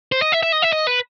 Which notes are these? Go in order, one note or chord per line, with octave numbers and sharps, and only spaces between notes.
C5
D#5
E5
E5
D#5
E5
D#5
B4